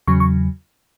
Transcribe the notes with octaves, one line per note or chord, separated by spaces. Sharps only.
E2 C#3 F#3 C#6
C#6